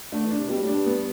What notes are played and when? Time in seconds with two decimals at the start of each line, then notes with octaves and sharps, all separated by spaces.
0.12 D3 A3
0.25 E3
0.30 D4
0.37 C3
0.49 B2 G3
0.61 A2
0.67 D4
0.73 G2
0.86 B3